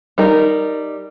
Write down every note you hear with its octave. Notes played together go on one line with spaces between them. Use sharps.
G3 D#4 A#4